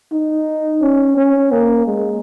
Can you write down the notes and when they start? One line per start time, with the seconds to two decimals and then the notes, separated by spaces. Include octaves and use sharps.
0.12 D#4
0.82 C#4
1.17 C#4
1.52 A#3
1.87 G#3